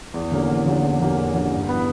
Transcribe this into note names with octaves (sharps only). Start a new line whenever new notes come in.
E2
D3 A#3 C#4 G4
E2
D3 A#3 C#4 G4
E2
D3 A#3 C#4 G4
E2
D3 A#3 C#4 G4
G2
E3 B3